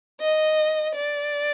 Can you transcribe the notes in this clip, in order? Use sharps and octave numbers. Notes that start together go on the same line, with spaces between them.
D#5
D5